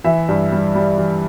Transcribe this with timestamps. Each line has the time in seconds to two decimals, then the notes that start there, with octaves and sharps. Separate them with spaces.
0.04 E3 E5
0.28 G2
0.52 G3
0.75 G3
0.98 E3